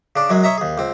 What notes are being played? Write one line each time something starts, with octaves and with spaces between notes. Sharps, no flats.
C#3 D4
F#2 F#3 G#3 G#4
C#5 D#5 E5 A#5
D#2 G#4
C#2 C4